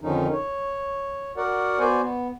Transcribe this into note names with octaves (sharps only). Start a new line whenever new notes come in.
F2 D3 D#3 F3 C#4 D#4
C#5
F#4 A#4 D5 F#5
B3 F#4 C5 D5 G#5
B3